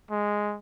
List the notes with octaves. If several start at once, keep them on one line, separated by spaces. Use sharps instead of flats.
G#3